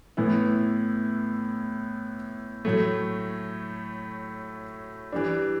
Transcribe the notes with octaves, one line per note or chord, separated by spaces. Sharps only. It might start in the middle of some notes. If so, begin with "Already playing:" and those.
A2 E3 B3 E4
A2 F#3 A3
E3 G3 D4